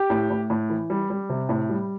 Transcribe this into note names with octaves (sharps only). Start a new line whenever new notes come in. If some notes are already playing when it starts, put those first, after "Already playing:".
Already playing: G4
A2
A2
A2
E3
G3
G3
C3
A2
G3